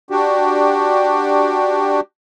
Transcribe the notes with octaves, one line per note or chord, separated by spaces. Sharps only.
D4 F#4 G4